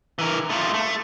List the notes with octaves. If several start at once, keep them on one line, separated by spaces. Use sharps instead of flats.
E3 A#4
A3 F4
A3